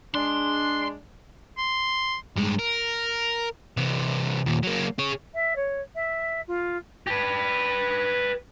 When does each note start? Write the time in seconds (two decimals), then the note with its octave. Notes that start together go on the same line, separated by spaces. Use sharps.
0.15 G#3 D4 C6
1.58 C6
2.36 G2 G#3
2.59 A#4
3.77 C3 E3
4.46 D#2 A#2
4.63 F#3 A#3
4.99 G#4 C#5
5.34 E5
5.56 C#5
5.95 E5
6.48 F4
7.07 G4 B4